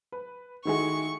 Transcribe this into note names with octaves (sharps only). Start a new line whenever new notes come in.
B4
D#3 G#3 A3 E4 F#4 G#4 C#6